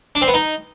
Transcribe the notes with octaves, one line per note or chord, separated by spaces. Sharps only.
D4
C4
B3
D#4